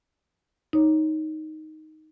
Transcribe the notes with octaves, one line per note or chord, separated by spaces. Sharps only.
D#4 C#5